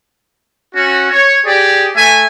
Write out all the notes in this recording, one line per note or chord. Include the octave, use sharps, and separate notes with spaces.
C#4 F#4
C#5
G4 G#4 D5
A3 E5 G#5